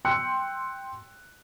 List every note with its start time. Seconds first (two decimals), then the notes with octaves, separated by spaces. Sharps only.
0.05 G5 C6 E6 F#6 C#7